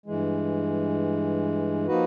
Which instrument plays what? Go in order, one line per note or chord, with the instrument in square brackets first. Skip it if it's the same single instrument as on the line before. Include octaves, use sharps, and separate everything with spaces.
[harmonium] G2 E3 G#3
F3 A#3 D#4 F#4 B4